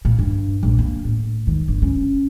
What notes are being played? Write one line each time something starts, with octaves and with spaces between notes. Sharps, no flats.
A#2
G2
A#1
A#3
A2
D#3
G1
C#4